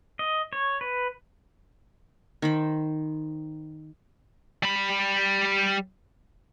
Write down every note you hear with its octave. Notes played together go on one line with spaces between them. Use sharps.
D#5
C#5
B4
D#3 C5 B5
G3 B5